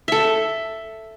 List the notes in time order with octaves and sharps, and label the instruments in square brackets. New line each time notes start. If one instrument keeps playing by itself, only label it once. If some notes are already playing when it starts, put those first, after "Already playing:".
[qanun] A4 E5